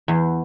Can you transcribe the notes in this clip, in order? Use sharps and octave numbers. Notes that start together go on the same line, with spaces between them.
E2